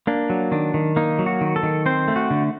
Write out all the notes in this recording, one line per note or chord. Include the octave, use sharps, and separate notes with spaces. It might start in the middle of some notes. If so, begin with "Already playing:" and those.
A#3 D4
F#3
D#3 D4
D#3
A#3 D#4
F#3
F#4
D#3
A4
D#3
C4 C5
A3
F#4
D3